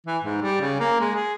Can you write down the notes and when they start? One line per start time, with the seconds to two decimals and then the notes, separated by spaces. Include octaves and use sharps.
0.06 E3
0.24 G#2
0.42 G3
0.61 C#3
0.80 A#3
1.01 G#3
1.15 G#4